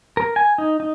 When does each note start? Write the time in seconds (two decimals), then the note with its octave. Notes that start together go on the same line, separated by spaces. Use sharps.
0.17 A#4
0.36 G#5
0.58 D#4
0.80 D#4